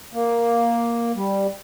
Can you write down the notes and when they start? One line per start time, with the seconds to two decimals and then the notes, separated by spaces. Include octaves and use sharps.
0.14 A#3
1.16 G3